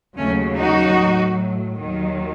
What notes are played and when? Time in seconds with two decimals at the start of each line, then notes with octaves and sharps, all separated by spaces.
0.17 D#2 C#3 F#3 A3 C#4
0.57 D#4 F#4
0.99 A2 F#3
1.79 D#2 D#3 F#3